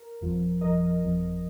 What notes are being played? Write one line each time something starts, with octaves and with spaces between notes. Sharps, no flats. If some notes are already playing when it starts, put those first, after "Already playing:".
Already playing: A#4
G1 F2 F3
G1 F2 F3 A#4 D#5
G1 F2 F3